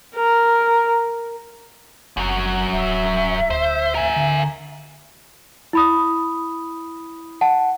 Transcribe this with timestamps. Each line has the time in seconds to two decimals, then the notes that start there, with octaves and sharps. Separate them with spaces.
0.15 A#4
2.17 F#1 F#2 F#3
2.73 D1 E5
3.50 D2 C5
3.95 A#4 G#5
4.16 D3
5.73 E4 B5 D#6
7.41 F#5 A5